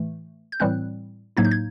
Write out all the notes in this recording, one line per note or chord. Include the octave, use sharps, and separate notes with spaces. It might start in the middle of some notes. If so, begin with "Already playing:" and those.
Already playing: A2 E3 A3
G6
A2 E3 G3 C4 F#6
A2 F#3 A#3 D#4 G#6
G6
G#6